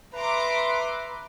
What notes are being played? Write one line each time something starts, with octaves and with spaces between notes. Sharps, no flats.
B4 E5 A#5 C6 D6